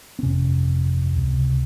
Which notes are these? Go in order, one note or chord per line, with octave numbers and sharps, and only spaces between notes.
C4
G1 F2 C3 C#4
C#2 C3